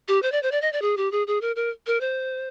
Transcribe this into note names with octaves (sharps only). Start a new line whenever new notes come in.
G4
C5
D5
C5
D5
D#5
D5
G#4
G4
G#4
G#4
A#4
A#4
A#4
C5